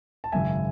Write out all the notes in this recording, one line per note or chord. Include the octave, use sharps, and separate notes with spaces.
A5
G#1 F#2 C#3 G#3 E5 G#5